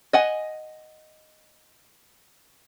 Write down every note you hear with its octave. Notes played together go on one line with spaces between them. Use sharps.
D#5 F#5 G#5